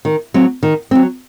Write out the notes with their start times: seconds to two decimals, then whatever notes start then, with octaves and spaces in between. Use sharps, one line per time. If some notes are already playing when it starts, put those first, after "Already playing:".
0.05 D#3
0.34 F#3 C4
0.63 D#3
0.91 F#3 C4